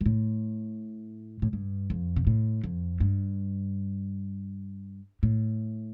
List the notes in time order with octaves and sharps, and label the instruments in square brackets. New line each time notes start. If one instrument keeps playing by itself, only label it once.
[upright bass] G2
A2
A2
G2
F2
C3
A2
F2
G2
A2